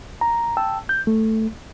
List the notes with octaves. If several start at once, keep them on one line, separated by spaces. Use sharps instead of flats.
A#5
G5 A5 E6
G6
A3